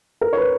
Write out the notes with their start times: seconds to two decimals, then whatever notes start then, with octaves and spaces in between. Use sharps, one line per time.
0.21 A#4
0.33 C#5
0.37 B4